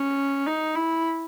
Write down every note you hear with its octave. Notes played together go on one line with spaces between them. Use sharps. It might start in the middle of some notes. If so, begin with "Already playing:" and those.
Already playing: C#4
D#4
E4